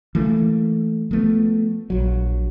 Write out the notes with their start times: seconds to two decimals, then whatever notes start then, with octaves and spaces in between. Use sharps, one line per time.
0.15 E3 A3 A#3
1.11 F3 A3 B3
1.90 A#1 F#3